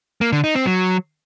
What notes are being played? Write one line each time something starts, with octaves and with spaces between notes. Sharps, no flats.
A#3
D3
D#4
C4
F#3